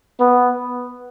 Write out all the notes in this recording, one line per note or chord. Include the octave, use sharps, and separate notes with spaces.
B3